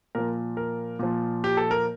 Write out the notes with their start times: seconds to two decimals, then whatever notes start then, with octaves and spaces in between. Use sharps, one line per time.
0.15 A#2 F3 A#4
0.57 A#4
0.99 A#2 F3
1.44 G4
1.57 A4
1.71 A#4